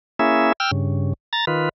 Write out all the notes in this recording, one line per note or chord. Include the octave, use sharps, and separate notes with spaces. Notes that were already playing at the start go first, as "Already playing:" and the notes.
A#3 C#4 E4 G#4 E5
G5 E6 F6
G2 C#3
A#5 A6
D#3 F4 B4